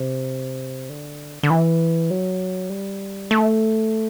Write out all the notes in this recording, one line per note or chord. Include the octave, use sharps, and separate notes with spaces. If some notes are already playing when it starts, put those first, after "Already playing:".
Already playing: C3
D3
D3
E3
F#3
G3
A3